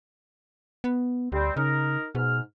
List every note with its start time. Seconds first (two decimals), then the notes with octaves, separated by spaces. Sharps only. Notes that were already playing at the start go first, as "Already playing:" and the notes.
0.84 B3
1.32 D2 G3 C4
1.56 C#3 D#4 A#4
2.15 G#2 B2 F6